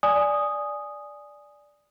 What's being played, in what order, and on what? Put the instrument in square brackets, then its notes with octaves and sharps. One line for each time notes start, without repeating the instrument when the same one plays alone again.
[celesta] D5 G#5 D#6